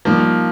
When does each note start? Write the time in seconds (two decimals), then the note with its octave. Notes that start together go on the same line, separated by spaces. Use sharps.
0.05 D#3 F3 G3 A#3